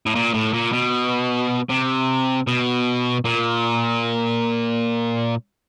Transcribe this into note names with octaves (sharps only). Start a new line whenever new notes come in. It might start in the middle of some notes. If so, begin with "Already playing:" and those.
A2
A#2
A2
A#2
B2
C3
B2
A#2